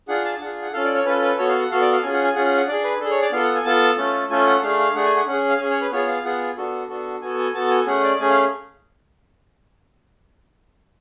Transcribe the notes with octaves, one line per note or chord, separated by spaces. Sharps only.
D4 F4 G#4 F#5
A5
D4 F4 G#4 F#5
F#5
C#4 F4 A4 F5
D5
C#5
C#4 F4 A4 B4
B4
B3 F#4 A4 C#5
F5
F#5
B3 F#4 A4 F5
D5
F5
C#4 F4 G#4 G#5
F#5
G#5
C#4 F4 G#4 F#5
F#5
F#5
D4 G#4 D5
B4
D4 G#4 A4
C#5
D5
B3 F4 A4 F5
F#5
G#5
B3 F4 A4 A5
A3 C#4 F4 A4
A3 C#4 F4 A4 G#5
F#5
A3 D4 G#4 F5
F5
A3 D4 G#4 F#5
G#5
F#5
C#4 G#4 F#5
F5
C#4 G#4 G#5
C#5
B4
B3 F4 G#4 C#5
F5
B3 F4 G#4 F#5
B3 D4 F#4 A4
B3 D4 F#4 A4
B3 F#4 A4 G#5
G#5
B3 F#4 A4 A5
G#5
A3 C#4 G#4 F#5
D5
A3 C#4 G#4 G#5
F5